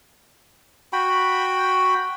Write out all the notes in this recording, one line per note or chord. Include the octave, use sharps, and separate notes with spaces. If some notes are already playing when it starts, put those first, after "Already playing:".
F#4 G5 B5